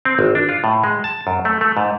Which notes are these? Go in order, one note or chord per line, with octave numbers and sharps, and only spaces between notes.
C4
G#1
D4
F4
A2
G#3
A5
F#2
A3
A3
G#2